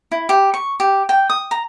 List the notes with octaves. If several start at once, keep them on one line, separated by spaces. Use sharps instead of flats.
E4
G4
C#6
G4
G5
D#6
A#5